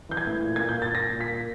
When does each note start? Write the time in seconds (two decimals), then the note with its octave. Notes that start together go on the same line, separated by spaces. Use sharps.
0.09 E3 G6
0.17 G#6
0.27 A2
0.43 A#2
0.56 A#2 G#6
0.69 G6
0.78 A#2 A6
0.94 A#2 A#6
1.11 A#2
1.21 B6
1.29 A#2